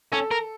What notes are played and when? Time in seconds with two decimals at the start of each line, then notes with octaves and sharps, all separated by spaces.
0.12 C#4 A4
0.31 A#4